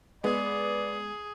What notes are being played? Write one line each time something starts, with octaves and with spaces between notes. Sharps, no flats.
G#3 B3 G#4 D5